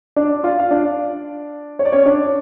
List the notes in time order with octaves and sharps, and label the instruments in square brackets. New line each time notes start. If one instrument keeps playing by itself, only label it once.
[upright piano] D4 D5
F4 F5
F5
D4 D5
C#5
D5
C#4 C#5
D4 D5